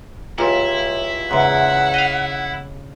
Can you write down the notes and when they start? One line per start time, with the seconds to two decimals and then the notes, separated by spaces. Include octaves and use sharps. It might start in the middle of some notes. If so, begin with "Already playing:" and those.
0.38 C#2 A#2 E4 F4 G4 C#5
1.31 E2 G#2 C#3 F#5
1.94 D#5 F5